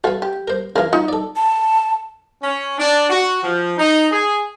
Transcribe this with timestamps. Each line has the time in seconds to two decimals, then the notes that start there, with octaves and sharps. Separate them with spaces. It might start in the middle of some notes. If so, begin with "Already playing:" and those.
0.04 F#4 A4 B4 F5
0.22 G4
0.48 A#4 C5
0.76 C#3 E3 A#4 F5
0.93 D#4 F4
1.08 A4 D5
1.36 A5
2.42 C#4
2.78 D4
3.10 F#4
3.43 F3
3.78 D#4
4.11 G#4